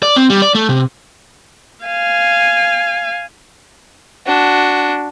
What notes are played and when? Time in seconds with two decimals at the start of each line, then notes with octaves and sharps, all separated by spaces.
0.03 D5
0.16 C4
0.30 G3
0.42 D5
0.55 A3
0.69 C3
1.85 F5 G#5
4.26 D4 F#4